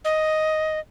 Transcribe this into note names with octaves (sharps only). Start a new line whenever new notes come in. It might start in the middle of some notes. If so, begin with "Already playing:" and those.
D#5